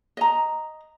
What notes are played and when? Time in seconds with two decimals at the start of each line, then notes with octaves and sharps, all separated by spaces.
0.17 D#5 A#5